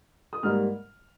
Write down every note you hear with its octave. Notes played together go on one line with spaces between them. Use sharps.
D#6
G#2 G3 A#3 F6